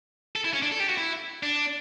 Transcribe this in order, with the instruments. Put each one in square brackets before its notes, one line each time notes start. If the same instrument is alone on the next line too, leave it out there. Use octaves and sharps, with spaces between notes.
[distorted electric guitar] A4
E4
C#4
D4
A4
G4
F#4
E4
D4